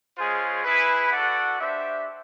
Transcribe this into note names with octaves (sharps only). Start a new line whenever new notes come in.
G#3 C#4 F4 G#4 C5
E4 G#4 B4
F#4 A4 D5 F#5
D4 G4 C5 E5